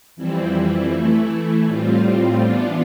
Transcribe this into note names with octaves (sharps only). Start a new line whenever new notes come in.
F2 E3 G3 C4 E4
E3 A3 E4
A2 G3 C4 F4
E3 B3 D4 F4